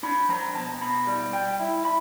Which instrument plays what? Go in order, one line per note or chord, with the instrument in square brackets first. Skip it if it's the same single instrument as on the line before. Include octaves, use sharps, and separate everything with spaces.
[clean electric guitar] D4 B5
F3 A#5
B2 A5
B2 B5
G3
G3 G5
E4
B5